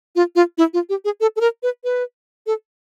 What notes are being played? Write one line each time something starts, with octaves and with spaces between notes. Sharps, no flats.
F4
F4
E4
F4
G4
G#4
A4
A4
A#4
B4
B4
A4